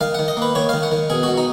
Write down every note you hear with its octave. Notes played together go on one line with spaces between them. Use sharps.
D#3 F5
D#3 F#5
D#5
A#3 B4
D#3 C#5
D#3 F5
F#5
D#3
B2 G#4
B2 F#4
D#4